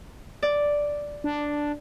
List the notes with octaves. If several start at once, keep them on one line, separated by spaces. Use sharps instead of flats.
D5
D4